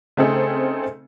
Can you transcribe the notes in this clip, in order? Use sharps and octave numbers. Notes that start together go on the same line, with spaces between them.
C#3 A3 C4 D#4 G#4 A4